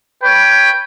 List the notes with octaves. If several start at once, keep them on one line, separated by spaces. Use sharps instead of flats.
B4 C#5 G5